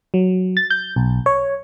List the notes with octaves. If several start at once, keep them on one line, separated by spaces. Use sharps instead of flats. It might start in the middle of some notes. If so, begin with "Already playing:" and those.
F#3
A6
G6
B1
C#5